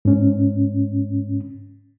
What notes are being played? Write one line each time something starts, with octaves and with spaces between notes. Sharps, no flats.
G#2 C#4